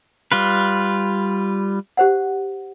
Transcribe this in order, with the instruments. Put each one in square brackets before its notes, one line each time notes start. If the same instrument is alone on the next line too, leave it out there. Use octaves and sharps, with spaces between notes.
[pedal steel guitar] G3 F4 B4
[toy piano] G4 C5 F#5